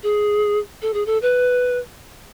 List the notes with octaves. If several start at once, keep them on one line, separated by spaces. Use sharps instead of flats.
G#4
A4
G#4
A4
B4